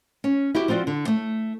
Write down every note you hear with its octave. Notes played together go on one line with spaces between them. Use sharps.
C#4
E4 F#4 G4
F3 C4 F4 F#4 D5
D3
A3